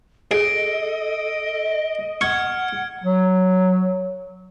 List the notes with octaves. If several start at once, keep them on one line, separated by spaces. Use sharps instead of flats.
G#4 A4 D#5 D7
F#5 C#6 F6 G#6
F#3